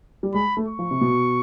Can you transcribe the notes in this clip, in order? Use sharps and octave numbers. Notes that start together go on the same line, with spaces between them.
G3
G#3 B5
A3
C#6
F3
C3
B2